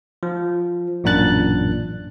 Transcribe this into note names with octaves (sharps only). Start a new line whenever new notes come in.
F3
A1 F#2 A#2 D4 F#6 A6